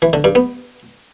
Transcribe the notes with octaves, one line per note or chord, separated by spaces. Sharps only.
E3
D3
G2
B3